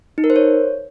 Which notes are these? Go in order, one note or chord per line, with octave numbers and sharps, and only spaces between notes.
D#4
A#4
C5
C#5